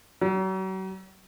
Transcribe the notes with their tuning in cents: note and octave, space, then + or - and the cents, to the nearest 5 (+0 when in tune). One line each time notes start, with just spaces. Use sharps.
F#3 +40